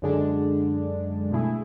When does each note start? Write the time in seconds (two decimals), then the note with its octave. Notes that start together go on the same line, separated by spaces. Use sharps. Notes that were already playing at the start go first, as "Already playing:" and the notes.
0.02 F#2 D3 G#3 D4
1.32 B2 A3 E4 G#4